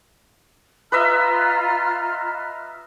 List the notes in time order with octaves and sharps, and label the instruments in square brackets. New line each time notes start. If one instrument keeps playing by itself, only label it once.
[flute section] F4 F6 [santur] B4 D#5 E5 [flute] A#5